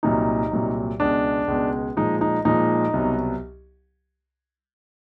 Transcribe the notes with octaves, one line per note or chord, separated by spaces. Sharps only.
C2 A#2 F#3 D#4
C2 A#2 F#3
C#2 B2 G#3 D4
C#2 B2 G#3
A#2 F3 G#3 D#4
D#4
A#2 F3 G#3 D#4
C2 B2 F#3